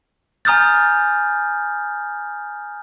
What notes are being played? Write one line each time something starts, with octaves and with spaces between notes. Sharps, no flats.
G#5 A#5 D#6 F6 G6 A6